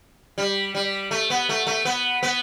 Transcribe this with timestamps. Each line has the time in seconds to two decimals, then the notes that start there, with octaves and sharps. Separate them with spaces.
0.38 G3
0.75 G3
1.11 A3
1.30 B3
1.49 A3
1.67 A3
1.85 B3
2.23 B3